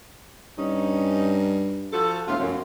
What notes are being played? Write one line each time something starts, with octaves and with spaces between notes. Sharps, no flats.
G2 C#4 D#4
F3 F#4 A4
E1 A2 F4
F1 F#2